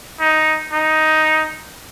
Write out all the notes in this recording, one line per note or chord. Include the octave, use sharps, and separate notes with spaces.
D#4
D#4